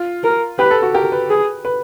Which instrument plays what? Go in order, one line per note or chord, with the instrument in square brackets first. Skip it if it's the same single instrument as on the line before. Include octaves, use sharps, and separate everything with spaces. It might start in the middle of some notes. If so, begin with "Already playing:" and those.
Already playing: [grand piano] F4
[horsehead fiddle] A#4
[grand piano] G4 [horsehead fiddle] B4
[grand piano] A4
F#4
[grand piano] G4 [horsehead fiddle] A#4
[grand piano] B4
[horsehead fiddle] G#4
[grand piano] B4